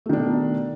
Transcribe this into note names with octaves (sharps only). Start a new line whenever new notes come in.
B2 D#3 A3 D4